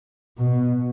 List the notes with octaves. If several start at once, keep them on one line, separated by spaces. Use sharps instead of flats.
B2